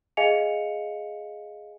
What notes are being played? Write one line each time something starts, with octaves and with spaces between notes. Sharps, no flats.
G#4 D#5 F5 G#5 C#7 F7